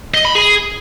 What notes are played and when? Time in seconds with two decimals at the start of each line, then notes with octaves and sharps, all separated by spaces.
0.14 D#5
0.25 B5
0.35 G#4